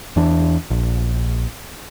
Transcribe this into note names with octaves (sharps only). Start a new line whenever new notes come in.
E2 E3 D4
A#1